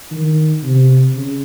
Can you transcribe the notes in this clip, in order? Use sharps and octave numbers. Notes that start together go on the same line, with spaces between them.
D#3
C3
C#3